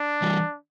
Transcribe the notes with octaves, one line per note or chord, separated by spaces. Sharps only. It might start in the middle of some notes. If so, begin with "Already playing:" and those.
Already playing: D4
E3 G3